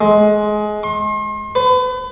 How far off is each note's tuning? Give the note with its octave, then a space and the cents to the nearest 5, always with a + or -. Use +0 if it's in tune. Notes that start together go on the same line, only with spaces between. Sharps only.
G#3 +20
C6 +40
B4 +35